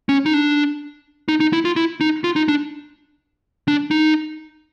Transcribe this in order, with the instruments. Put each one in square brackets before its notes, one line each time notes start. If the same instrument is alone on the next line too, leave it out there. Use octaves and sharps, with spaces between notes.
[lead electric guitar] C#4
D#4
D4
D#4
D#4
E4
F4
E4
D#4
F4
D#4
D4
D4
D#4